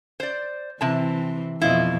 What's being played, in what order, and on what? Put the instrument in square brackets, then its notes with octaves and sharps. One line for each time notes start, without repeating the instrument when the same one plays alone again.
[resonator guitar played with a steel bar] C5 D5
[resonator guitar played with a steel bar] C3 A5 [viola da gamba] E3 C4
[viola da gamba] F2 B2 [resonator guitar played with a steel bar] E4 F4 D#5